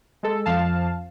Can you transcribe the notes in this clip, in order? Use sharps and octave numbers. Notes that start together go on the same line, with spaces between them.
G#3 A4
F2 F3 F5 A5